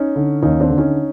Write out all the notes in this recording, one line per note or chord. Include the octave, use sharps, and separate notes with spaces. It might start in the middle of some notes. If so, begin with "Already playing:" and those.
Already playing: C#4 D#4
D3
D#2 C#4 D#4
C4 D4
D3
C#4 D#4